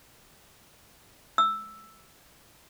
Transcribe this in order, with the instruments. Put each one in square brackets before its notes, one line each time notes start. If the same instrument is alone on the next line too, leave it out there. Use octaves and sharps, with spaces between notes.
[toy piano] E6